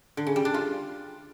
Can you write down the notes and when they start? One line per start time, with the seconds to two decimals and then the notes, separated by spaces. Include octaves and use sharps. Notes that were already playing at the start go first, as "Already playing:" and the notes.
0.17 D3
0.27 C#3
0.36 G3
0.45 D4
0.54 F4